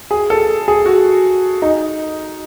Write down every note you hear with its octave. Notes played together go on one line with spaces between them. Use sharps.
G#4
A4
G#4
F#4
D#4